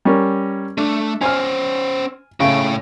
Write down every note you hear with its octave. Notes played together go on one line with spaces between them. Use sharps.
G3 C#4 A#4
A3 D4
C#4 C5 G#5 F6
A2 C#3 A3 G5